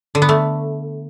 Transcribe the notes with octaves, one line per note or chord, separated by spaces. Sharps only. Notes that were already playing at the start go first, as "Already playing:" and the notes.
D3
B3
A3